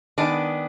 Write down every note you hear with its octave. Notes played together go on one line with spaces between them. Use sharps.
D#3 G#3 B3 D4